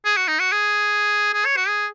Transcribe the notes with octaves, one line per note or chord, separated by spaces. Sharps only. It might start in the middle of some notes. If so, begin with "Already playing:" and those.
G#4
F#4
D#4
F#4
G#4
G#4
C#5
F#4
G#4